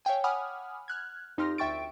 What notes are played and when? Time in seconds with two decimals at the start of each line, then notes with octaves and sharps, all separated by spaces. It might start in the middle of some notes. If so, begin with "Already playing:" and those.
0.05 C#5 E5 F5 G5 G#5
0.24 F#5 G#5 B5 D6 D#6 F6
0.88 F6 F#6 G#6
1.38 F2 D#4 G4 C6 F6 A#6
1.58 D2 E5 G5 C#6 A6 D7